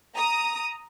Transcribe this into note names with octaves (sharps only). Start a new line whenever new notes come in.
A#5 D#6